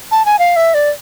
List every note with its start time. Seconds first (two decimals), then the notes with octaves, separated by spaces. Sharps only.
0.11 A5
0.26 G#5
0.39 F5
0.56 E5
0.74 D5